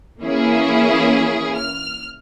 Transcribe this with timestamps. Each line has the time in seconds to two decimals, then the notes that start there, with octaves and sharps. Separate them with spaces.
0.22 E3 A#3 C#4 E4 G#4
1.56 F6